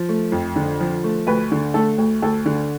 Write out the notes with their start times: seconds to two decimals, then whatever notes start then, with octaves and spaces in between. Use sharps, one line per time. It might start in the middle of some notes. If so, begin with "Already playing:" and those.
Already playing: F3
0.09 A3
0.32 F2
0.56 D3
0.80 F3
1.04 A3
1.27 D2 B4
1.52 D3
1.74 A3 A4
1.98 D2
2.22 D2 A4
2.46 D3